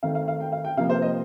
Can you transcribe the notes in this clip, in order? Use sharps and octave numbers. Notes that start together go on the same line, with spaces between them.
D#3 A3 C4 F5
F5
F5
G5
F5
G5
C3 F3 A#3 F5
C5
D#5